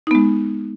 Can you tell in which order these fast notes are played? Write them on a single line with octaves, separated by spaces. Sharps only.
D#4 B3 G#3